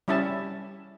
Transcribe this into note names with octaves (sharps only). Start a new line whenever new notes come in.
G3 C#4 E4 E5 A5